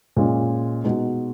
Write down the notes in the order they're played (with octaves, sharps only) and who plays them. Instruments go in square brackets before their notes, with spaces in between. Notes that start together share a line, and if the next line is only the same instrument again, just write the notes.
[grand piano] A#2 G#3 C#4
B2 G#3 D#4 F#4